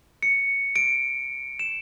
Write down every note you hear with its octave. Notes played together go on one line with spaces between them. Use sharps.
C#7
D7
E7